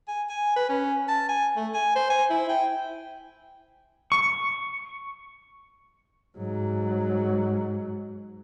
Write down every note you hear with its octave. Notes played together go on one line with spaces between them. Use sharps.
G#5
G#5
B4
C#4
A5
G#5
A3
G#5
C5
G#5
E4
G5
C#6
G#2 F#3